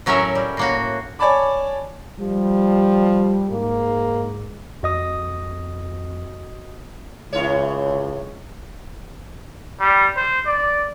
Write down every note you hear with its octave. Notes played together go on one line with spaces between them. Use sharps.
A2 F#3 C#4 A#4 E5
G3
A2 A#3 F#4
C#5 D5 G#5 A5 B5 D6
F3 G3
G#2 A#3
F2 F#4 D#5 D#6
C#2 A2 E4 C#5
G3
C5
D5